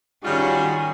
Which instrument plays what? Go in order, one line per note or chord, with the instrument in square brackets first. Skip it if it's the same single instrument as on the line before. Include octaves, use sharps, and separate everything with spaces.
[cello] D#3 C#4 [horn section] G3 F4 F#4 [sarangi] G#4